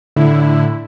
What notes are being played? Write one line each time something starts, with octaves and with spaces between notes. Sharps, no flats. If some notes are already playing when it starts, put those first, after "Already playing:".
A2 D3 E4